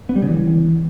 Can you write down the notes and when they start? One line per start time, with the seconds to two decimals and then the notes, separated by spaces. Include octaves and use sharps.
0.09 B3
0.16 G3
0.22 C#3
0.29 E3